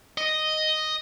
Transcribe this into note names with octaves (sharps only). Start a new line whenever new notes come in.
D#5